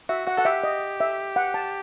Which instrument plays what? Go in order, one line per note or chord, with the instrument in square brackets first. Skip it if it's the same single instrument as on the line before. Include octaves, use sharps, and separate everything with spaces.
[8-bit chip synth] F#4 [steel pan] E5
[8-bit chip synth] F#4 [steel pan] F#5
[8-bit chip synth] A4 [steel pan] F#5
[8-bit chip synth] G4 [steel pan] E5
[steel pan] D#5
E5
F#5
A5